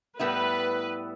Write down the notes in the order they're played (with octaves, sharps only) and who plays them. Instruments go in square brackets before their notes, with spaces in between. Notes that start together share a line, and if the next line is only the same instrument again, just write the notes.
[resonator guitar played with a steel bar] A2 G3 B3 E4 [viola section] B4